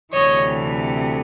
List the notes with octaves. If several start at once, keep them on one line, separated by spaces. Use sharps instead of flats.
D2 C3 E3 C#5 D#5